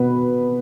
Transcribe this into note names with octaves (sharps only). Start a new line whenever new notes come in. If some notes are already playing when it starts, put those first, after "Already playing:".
Already playing: B2 B3 B4